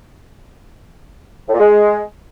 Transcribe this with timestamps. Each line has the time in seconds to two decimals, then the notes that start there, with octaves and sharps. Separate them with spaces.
1.49 A2
1.54 A#2
1.59 G#3